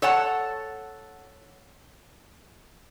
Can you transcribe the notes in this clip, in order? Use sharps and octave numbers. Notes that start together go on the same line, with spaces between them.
A4 C#5 F#5 A5